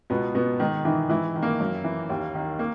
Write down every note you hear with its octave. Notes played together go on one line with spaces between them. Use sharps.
C#2 B2 B3
B2 B3
G#2 D#3 D#4
D#3 E3 D#4
G#2 E3 E4
D#3
A#3 A#4
F#2
E3
D#2
D#3
A#3